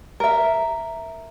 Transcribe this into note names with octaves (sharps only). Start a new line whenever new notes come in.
A#4 E5